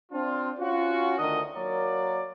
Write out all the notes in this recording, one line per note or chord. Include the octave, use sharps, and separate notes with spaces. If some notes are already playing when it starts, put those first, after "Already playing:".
C4 D4 F4
C#4 F4 F#4
D2 D#3 D4 A#4 D#5
F#3 A#3 A#4 C#5 D5